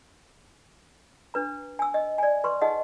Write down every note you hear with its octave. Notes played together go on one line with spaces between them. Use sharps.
D4 B4 A#5
G#5 E6
D#5
D5 G#5
B4 C6 C#6
D#4 G#4 D#5 F#5